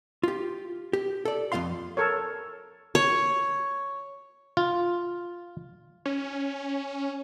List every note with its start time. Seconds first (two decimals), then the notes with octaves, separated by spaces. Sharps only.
0.23 F4 G4
0.93 G4
1.25 A4 D5
1.52 F2 F#3 F4 F5 C6
1.97 A4 A#4 C#5
2.95 C#5
4.57 F4
6.05 C#4